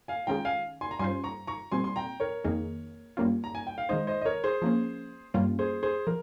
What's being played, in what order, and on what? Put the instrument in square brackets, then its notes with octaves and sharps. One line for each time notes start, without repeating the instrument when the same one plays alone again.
[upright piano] F5 G#5
[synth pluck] D#3 G#3 C#4 F4 G#4 [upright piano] G5 A#5
[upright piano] F5 G#5
G#5 C6
A#5
[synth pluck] G2 G3 C#4 F4 C5 [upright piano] G#5 C6
[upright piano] A#5 C#6
A#5 C#6
[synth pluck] A#2 G3 C4 [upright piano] G#5 C6
[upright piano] C6
G5 A#5
A#4 C#5
[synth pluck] F2 D#3 A#3 D#4 G#4
G2 G3 A#3 C#4 F4
[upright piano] A#5
G#5
G5
F5
[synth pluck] D#3 G#3 D#4 [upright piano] C5 D#5
[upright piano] C5 D#5
D#5
A#4 C#5
G#4 C5
[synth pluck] F3 A#3 C#4
G2 G3 A#3 C#4 F4
[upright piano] G#4 C5
G#4 C5
[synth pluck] F3 [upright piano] A#4